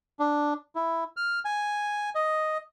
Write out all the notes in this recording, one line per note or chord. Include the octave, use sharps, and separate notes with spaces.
D4
E4
F6
G#5
D#5